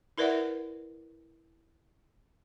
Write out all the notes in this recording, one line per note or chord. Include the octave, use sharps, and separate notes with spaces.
E4 A#4 B4 D5 E5 F#5